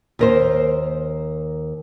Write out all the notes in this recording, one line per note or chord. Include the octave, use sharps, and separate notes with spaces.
D#2 A#4 C5